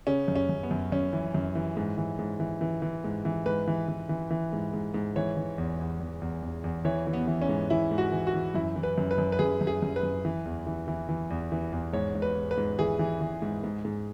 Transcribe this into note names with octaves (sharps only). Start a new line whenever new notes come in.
C#3 C#4
F#2
C#4
F#2
B3
F#2
F#2 C#4
E3
F#2
E3
G#2
E3
G#2
E3
E3
E3
G#2
E3
G#2 B4
E3
E3
E3
E3
G#2
G#2
G#2
E3 C#5
E3
E2
E2
E2
E2
E2
E2
E3 C#5
E3
B3
E3
C#4
G#2
E3 E4
G#2
F#4
E3
F#4
E3
F#2 E4
E3
B4
F#2
B4
F#2
B4
F#2 G#4
F#2
G#4
F#2
B4
F#2
E3
E2
E3
E3
E3
E2
E3
E2
G#2 C#5
G#2
B4
G#2
B4
G#2
E3 G#4
E3
E3
G#2
G#2
G#2